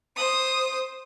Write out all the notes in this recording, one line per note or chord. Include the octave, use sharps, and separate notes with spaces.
C5 D#6